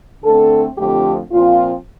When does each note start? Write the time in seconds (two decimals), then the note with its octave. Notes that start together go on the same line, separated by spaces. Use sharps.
0.24 D3 A3 C4 A4
0.78 F2 D3 F3 A3 C4 G4
1.31 A#2 F3 C4 F4